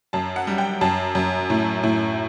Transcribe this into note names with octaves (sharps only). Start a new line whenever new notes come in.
F#2 A5
F#5
G3
G5
F#2 A5
F#2
A2
A2